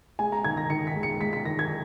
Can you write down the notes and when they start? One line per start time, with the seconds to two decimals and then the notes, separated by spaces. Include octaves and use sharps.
0.19 G#3 G#5
0.32 A#5
0.44 D#3 G#6
0.57 A#6
0.70 D#3 C#7
0.87 B6
0.95 G#3
1.03 C#7
1.21 G#3 B6
1.33 B6
1.45 D#3 A#6
1.59 G#6